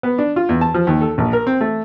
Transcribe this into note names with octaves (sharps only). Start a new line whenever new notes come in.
B3
D4
F4
E2
A5
F3
D#2
A4
A#1
A#4
C4
A3